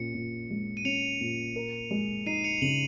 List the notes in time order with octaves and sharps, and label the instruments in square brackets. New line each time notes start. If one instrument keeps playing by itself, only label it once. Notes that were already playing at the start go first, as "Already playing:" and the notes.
Already playing: [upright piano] A#2 C#4 [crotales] C#7
[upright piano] A#2
G#3
[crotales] D#7
[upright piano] C#4 [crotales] C#7 F7
[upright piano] A#2
A#4
G#3
[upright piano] D#4 [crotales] C7 D#7
[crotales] C#7 F7
F7
[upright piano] C#3 [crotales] D#7 F#7